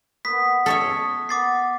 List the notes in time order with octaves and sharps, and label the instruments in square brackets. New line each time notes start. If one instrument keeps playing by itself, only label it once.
[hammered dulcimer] B3 B4 [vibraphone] D#6 [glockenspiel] B6
[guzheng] A4 C#5 E5
[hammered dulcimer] B3 [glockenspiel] D6 A6 C7